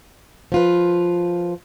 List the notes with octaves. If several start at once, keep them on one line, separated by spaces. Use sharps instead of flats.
F3 F4 B4